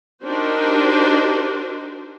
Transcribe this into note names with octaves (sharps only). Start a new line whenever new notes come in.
D4 D#4 F#4 G4 A#4 C5